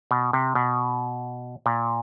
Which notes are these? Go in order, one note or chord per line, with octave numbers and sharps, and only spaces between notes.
B2
C3
B2
A#2